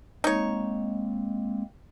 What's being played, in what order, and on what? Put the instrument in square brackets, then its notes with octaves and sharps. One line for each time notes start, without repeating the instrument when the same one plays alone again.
[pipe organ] G#3 A#3 C4 [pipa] D#4 C#5